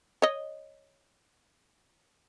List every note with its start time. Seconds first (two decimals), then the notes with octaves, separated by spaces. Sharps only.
0.22 C#5 D#5